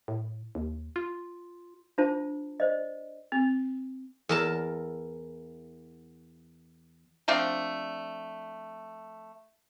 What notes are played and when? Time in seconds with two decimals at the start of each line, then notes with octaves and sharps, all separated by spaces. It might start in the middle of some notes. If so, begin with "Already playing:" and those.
0.08 A2
0.55 D#2
0.96 F4
1.98 D4 F4 C5 A5
2.60 C5 D5 D#5
3.32 C4
4.29 E2 A#4 A5
7.28 F3 A3 C4 D4